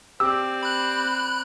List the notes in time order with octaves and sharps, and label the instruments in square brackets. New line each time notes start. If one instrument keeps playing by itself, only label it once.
[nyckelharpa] C4 D5 [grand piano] G4 D6 [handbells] E6
[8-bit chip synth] B5 F#6